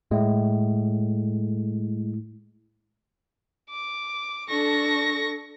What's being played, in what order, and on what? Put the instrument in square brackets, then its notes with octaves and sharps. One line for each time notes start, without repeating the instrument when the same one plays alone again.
[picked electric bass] A2 [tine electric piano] G#3
[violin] D6
[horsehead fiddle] D4 A4 [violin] C#6 A#6